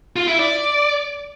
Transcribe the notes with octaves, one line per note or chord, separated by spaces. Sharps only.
F4
E4
D5